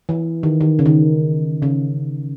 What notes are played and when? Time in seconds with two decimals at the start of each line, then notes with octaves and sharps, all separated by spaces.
0.09 E3
0.43 D#3
0.61 D#3
0.79 C#3
0.86 D#3
1.62 C#3